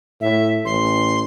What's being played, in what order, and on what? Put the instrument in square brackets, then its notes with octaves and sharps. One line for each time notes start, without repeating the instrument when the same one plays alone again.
[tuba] A2 [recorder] E5
[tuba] A1 [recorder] C6